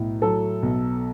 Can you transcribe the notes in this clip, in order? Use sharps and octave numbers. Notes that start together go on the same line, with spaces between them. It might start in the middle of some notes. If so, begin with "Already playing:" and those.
Already playing: B1 A2
F#3 A4
B1